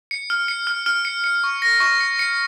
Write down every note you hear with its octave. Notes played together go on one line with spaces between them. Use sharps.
C#7
F6
C#7
F6
F6
C#7
C#7
C#6
A#6
C#6
C#7
C#7